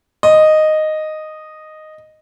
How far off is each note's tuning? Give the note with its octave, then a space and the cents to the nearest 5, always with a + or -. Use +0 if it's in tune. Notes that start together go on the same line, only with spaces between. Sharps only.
D#5 -5